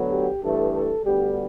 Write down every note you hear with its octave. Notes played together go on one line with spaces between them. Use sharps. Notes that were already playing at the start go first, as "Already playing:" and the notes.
Already playing: D2 D3 F#3 B3
G4
G2 E3 A3 A4
A4
D2 D3 G3 B3 G4